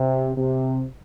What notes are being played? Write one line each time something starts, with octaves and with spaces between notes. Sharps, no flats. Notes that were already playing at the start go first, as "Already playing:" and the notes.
Already playing: C3
C3